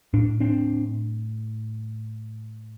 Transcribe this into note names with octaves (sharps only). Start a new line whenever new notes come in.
A2 D4
C4 D4